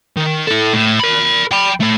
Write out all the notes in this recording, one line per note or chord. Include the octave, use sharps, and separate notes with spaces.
D#3
E4 A4
A2
A#4 B5
G5 B5
A3 C#5